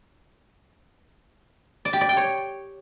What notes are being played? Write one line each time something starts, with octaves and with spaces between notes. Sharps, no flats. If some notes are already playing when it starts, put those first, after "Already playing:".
D5
G4
D5
G5
C#5